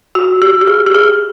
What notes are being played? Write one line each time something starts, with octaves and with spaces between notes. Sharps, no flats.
F#4
G4
G4
G#4
G4
G#4